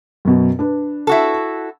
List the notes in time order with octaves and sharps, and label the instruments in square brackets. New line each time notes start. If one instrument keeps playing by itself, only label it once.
[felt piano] F#2 B2
D4 B4
[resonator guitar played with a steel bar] E4 F#4 A4